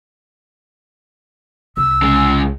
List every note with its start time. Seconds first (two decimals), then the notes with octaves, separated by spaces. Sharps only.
1.77 C2 E6
2.02 C#3 G#3